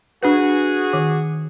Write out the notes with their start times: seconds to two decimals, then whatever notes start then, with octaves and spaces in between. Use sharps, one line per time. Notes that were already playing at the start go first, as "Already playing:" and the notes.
0.23 D4 F#4 G#4 B4
0.93 D#3